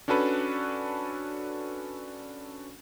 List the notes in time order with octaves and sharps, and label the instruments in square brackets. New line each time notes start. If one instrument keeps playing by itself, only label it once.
[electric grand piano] C#4 D4 F#4 A4 B4